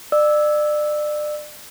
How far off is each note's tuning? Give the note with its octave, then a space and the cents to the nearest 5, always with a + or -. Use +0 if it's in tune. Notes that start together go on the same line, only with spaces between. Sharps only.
D5 +30 E6 -5